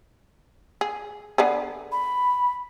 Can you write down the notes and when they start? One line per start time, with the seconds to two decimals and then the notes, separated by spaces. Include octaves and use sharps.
0.81 G#4
1.38 D3 B3 G#4
1.92 B5